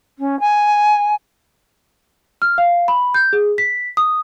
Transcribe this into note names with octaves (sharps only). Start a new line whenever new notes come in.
C#4
G#5
F6
F5
B5
G6
G#4
B6
D#6